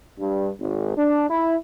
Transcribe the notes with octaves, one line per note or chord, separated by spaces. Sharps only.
G2
G#1
D4
E4